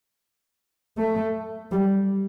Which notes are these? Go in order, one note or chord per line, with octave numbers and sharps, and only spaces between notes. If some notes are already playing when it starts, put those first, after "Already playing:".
A3
G3